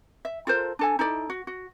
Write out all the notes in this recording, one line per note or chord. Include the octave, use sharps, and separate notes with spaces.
E5
F4 A4 A#4 C5
D4 A4 G#5
D#4 E4 A4 D5
F#4
F#4